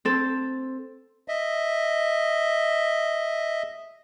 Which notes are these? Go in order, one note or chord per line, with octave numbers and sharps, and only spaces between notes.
C4 A4
D#5 E5